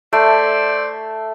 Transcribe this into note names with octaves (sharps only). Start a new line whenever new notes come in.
A3 C5 D5 E5